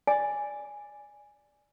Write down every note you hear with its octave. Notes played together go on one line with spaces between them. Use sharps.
D5 G#5